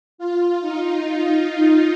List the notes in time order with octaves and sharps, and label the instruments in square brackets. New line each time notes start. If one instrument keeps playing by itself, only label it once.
[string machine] F4
D#4
F4
D#4